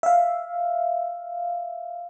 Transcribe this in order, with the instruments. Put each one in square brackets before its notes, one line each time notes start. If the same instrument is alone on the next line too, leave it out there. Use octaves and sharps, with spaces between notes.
[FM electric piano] E5 F5